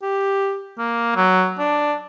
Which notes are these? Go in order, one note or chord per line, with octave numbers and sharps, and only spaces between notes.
G4
A#3
F#3
D4